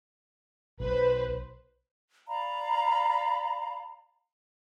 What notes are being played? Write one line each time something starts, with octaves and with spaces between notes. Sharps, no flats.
B1 B4 C5
D5 F5 A#5 B5